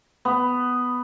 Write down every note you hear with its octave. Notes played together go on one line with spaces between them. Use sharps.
B3